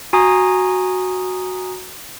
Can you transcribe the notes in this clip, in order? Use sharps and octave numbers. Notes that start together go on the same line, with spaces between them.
F#4 G#5 A#5 D#6